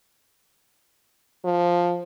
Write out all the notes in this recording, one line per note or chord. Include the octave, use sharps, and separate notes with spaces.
F3